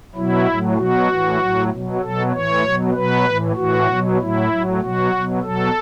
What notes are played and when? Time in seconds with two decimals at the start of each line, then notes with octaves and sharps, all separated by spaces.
0.15 B2 F#3 E4
0.47 A2 F#3
0.77 B2 F#3 F#4
1.08 A2 E3
1.39 A2 F#3
1.70 B2
1.75 F#3
2.01 B2 F#3 A4
2.32 A2 E3 C#5
2.63 B2 F#3
2.94 B2 F#3 B4
3.25 A2 E3
3.56 A2 E3 F#4
3.87 B2 F#3
4.19 A2 F#3 E4
4.49 A2 F#3
4.81 B2 F#3 F#4
5.12 B2 F#3
5.42 B2 F#3 A4